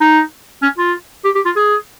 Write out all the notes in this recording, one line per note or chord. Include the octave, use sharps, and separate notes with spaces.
D#4
C#4
F4
G4
G4
F4
G#4